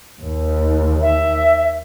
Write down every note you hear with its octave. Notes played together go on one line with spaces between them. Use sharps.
D#2
E5